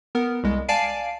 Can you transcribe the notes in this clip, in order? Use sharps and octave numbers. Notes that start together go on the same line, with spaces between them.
B3 A#4
C2 G#3
D5 F5 G#5 A5 C7 D7